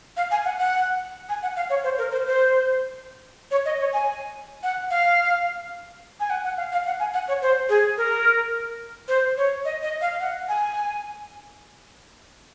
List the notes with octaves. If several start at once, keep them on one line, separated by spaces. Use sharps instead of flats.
F5
G#5
F#5
F#5
G#5
F#5
F5
C#5
C5
A#4
C5
C5
C#5
D#5
C#5
G#5
F#5
F5
G#5
F#5
F#5
F5
F5
F#5
G#5
F#5
C#5
C5
G#4
A#4
C5
C#5
D#5
D#5
F5
F#5
G#5